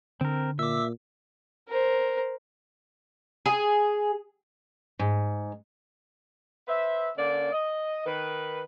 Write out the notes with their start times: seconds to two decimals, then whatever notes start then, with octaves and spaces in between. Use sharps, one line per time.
0.21 D3 C4 A#4
0.59 A#2 E5 D6 E6
1.68 A#4 C5
3.46 G#4
4.99 G#2
6.68 B4 C5 E5
7.17 D3 A#3 C#4 D5
7.53 D#5
8.06 D#3 B4